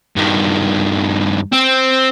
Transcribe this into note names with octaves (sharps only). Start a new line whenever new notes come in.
G2 D#3
C4